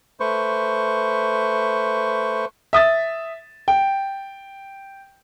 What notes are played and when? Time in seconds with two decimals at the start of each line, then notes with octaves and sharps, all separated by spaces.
0.20 A3 B4 C5 C#6
2.73 E5 D#6 A6
3.68 G5